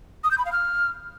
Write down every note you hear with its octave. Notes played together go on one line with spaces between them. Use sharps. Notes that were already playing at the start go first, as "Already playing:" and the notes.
D#6
G6
B5
F5
F6